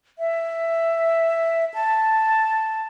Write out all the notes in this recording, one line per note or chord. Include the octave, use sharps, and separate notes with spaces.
E5
A5